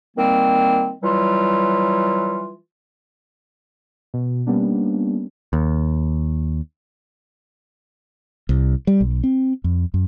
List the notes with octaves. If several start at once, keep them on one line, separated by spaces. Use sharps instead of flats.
D#3 G3 A#3 C4
E3 F#3 G3 F4
B2
G3 A#3 B3 C#4 D4
D#2
C2
G3
B1
C4
F2
F#2